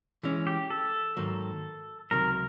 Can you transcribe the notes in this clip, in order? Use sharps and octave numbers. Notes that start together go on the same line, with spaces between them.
E3 G#3 C#4
G4
A4
G#2 D#3 F#3 A#3
C#2 C3 D#3 F#3 A#4